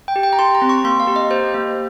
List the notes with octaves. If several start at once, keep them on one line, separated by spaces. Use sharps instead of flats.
G5
G4
G5
A#5
G4 C6
A#5
C4
C#6
A#3 C6
F5
G4
D#5
G4 C5
A#3